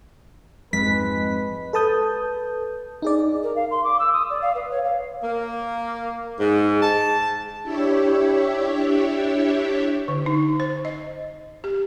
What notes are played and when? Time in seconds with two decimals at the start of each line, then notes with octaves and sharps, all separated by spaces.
0.73 F2 G#2 G#3 B4 B6
1.73 A4 B4 A5 D#6 G6
3.02 D#4 G#4 D5
3.43 A#4
3.56 F5
3.71 C6
3.84 D6
3.99 E6
4.13 D#6
4.30 D5
4.42 F5
4.55 B4
4.71 C#5
4.85 F5
5.24 A#3
6.40 G#2
6.82 A5
7.63 D4 E4 G4 C#5 E5
10.08 D3
10.26 D#4
10.60 C5
10.85 D#5
11.64 G4